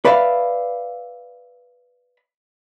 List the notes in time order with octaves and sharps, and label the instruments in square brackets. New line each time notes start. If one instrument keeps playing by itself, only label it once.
[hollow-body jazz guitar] B4 D5 E5 F5